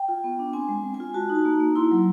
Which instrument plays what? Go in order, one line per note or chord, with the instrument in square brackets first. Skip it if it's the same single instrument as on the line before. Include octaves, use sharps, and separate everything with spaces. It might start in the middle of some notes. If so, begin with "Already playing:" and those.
Already playing: [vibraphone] G5
F4
B3
D4
C4 G#5
G#3
G#3
G#5
F4
F#4 A5
D#4
A5
A#3
A#3
E4 C6
F#3